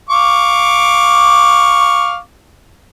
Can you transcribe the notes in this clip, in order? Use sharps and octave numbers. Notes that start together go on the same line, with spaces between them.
F5 C#6 D6